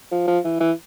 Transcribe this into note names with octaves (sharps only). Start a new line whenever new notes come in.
F3
F3
E3
E3